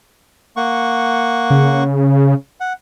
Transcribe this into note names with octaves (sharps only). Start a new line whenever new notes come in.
A#3 F#5 C#6
C#3
F#5